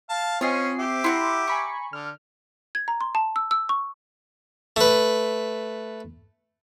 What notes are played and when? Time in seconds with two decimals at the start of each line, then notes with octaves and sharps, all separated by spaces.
0.09 F5 A5
0.41 C4 C#4 F4 D#5 G#5 C7
0.79 G4 E5 D6
1.04 E4 F#5 A#5 C6
1.47 G#5 A#5 B5 C#6
1.93 D3 F6
2.75 G#6
2.88 A#5
3.01 C6
3.15 A5
3.36 E6
3.51 E6
3.69 C#6
4.76 A3 B4